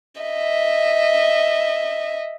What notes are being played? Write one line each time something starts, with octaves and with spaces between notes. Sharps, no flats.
D#5 E5